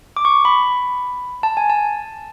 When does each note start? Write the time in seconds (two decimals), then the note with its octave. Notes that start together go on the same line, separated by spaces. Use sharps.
0.17 D6
0.25 C#6
0.45 B5
1.43 A5
1.57 G#5
1.70 A5